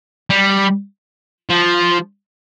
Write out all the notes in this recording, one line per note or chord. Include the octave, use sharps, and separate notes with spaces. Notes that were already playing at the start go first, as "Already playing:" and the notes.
G3
F3